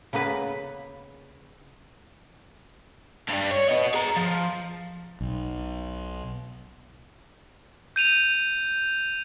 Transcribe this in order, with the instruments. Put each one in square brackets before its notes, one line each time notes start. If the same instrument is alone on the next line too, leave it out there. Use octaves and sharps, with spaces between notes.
[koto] C#3 A#3 B3 B4
[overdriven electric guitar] G2 G3
C#5
B3 D#5
G#4 A#5
F3
[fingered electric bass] B1
[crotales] G6 D#7 F7